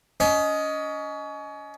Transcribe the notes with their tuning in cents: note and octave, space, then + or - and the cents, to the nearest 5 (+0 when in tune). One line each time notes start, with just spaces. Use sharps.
C#4 +30 D#5 +5